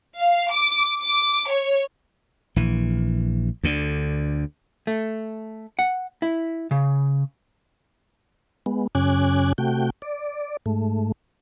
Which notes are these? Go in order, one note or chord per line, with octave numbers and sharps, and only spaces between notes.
F5
D6
D6
C#5
A#1 E3
D2 D3
A3
F#5
E4
C#3
G#3 B3
F#2 C#3 C#4 G#5 D6 F#6
C3 A3 F#4 G5
D5
G#2 A3